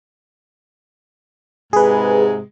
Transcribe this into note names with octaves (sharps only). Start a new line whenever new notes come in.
G#2 C3 G#3 G#4 B4